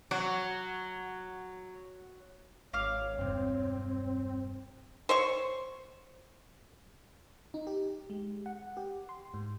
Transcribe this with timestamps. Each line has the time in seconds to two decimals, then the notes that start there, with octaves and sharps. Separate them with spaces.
0.11 F#3 F#4
2.73 G#1 C#5 F5 D6 F6
3.19 E1 G2 C4
5.09 C5 C#5 C#6
7.54 D#4
7.67 G4
8.10 G#3
8.46 F#5
8.77 G4
9.09 C6
9.34 G#2